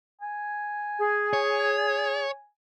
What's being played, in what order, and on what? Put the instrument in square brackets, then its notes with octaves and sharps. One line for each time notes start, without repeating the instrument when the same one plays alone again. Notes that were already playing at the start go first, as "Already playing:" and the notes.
[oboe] G#5
[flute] G#4
[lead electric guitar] C#5